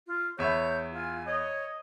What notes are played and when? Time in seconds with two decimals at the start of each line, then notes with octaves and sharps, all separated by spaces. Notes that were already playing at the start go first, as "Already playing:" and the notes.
0.07 F4
0.39 E2 C#5 E5 B5 G6
0.94 F4 G#5
1.26 C#5 D#5